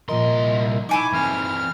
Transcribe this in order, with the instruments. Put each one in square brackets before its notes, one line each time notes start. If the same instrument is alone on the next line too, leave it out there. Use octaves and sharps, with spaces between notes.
[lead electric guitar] C2 C6 [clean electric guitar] A#2 F3 A#4 [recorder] D#5
[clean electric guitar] D#4 [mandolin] E4 G#5 C#6 [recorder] D6
[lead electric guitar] E3 C4 [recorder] F6